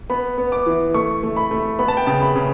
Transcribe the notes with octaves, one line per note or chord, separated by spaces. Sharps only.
B3 B5
B3
D6
E3
A3 C#6
A3
B5
A3
B3 B5
A5
G5
C#3 A5
B5
C#3